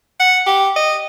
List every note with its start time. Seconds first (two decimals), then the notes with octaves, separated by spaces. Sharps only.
0.20 F#5
0.46 G4
0.76 D#5